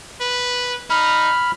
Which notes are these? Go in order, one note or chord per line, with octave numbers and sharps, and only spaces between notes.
B4
D#4 B5 F6